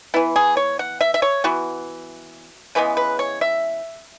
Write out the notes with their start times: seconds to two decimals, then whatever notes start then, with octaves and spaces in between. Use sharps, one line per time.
0.14 E3 B3 E4
0.36 G#4
0.57 C#5
0.79 F#5
1.01 E5
1.14 E5
1.22 C#5
1.44 E3 B3 F#4
2.75 C#3 E3 G#3 B3 B4
2.97 B4
3.19 C#5
3.41 E5